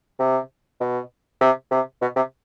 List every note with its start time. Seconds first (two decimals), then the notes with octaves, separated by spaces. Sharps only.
0.19 C3
0.80 B2
1.41 C3
1.71 C3
2.02 B2
2.16 C3